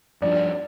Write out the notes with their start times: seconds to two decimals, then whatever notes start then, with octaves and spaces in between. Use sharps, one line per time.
0.22 G2 F3 D4 D5